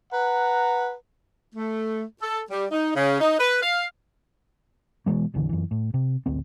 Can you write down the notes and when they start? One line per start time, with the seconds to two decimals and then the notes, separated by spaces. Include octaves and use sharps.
0.12 B4 F#5 A#5
1.55 A3
2.22 A4
2.51 G3
2.71 D#4
2.95 C#3
3.20 D#4
3.40 B4
3.63 F5
5.06 B2 E3 G#3 A#3
5.34 F#1 B1 D3 E3
5.49 F#2 E3
5.71 A2
5.94 C3
6.26 D1 G#1 D2 C4